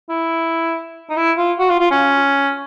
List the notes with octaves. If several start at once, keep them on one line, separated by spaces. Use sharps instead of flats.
E4
D#4
E4
F4
F#4
F4
F4
C#4